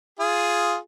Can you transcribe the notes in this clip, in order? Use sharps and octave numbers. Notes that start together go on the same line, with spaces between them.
F4 G#4